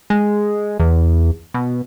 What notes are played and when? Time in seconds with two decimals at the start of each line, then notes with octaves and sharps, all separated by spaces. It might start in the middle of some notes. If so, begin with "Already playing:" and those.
0.10 G#3
0.79 E2
1.54 B2